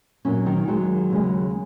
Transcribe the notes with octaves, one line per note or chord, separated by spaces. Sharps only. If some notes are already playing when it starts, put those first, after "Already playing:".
A#2 F#3 C#4
D#3 D#4
D#2 D#3 F#3 G#3 F#4
D#2 C#3 G#3